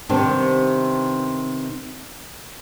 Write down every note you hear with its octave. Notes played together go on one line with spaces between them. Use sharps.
C3 D#3 G3 B3 C4 D4